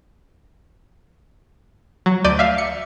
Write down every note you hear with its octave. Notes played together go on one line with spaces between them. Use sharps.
F#3
D2 D5 G6 D#7
E5 F5
C#7